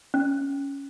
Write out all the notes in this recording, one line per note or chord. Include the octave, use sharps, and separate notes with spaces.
C#4